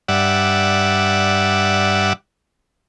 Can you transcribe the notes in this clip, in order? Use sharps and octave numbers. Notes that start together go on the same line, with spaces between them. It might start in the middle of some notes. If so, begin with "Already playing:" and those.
G2 D5 E5 F#5